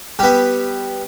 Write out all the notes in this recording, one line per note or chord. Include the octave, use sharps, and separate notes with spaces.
G3 B3